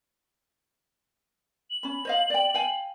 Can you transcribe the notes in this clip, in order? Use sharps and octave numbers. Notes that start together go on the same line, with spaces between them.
F#7
C#4 B5
C5 D#5 F5
D5 G5
F5 G5 G#5